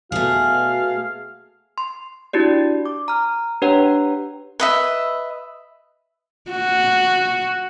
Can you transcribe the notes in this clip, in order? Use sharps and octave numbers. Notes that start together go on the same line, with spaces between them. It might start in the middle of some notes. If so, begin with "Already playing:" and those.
B2 A3 F#4 G#4 F5
C6
D4 E4 F#4 G4 D5
D6
A#5 F6
D4 G4 B4 C#5 F#5 A#5
B4 D#5 E5
F#4